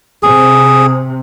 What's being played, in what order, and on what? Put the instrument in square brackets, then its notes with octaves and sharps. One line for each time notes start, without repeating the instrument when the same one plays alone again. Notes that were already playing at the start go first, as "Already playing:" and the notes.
[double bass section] C3 [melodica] G#4